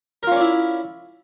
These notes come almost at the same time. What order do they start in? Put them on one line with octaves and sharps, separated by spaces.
A#4 F4 C#4 D5 E4